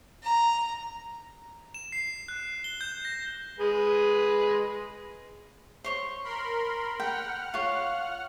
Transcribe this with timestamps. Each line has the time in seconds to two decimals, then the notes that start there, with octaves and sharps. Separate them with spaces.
0.23 A#5
1.74 E7
1.92 C7
2.28 F#6
2.64 G7
2.81 G6
3.05 A#6
3.59 G#3 G#4 B4
5.84 C5 C#5 C#6
6.23 A#4 B5 C6
7.00 F#5 G5 F6
7.54 F4 C#5